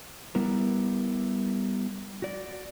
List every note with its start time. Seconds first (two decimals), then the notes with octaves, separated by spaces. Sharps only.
0.35 G3 B3 E4 A#4
2.22 F#4 D5